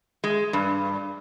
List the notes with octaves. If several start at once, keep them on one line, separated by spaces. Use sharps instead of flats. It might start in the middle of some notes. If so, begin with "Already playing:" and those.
G#3
G2